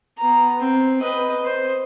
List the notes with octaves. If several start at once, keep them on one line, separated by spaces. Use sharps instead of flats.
B3 A#5
C4
B4 D#5
C5